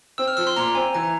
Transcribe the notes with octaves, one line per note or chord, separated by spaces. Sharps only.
C4 E6
F6
F3 E6
C6
A#2 A#5
C4 G#5
E3 A#5